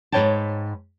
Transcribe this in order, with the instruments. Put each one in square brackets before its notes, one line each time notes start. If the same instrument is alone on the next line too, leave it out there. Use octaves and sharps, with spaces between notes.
[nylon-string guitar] G#2 C#3 B4 C#5 G5 A5